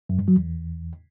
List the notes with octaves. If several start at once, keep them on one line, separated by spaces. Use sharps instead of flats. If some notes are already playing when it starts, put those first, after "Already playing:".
F#2
G2
F#3
E2